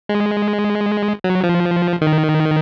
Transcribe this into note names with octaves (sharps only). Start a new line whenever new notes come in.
G#3
F#3
F3
D#3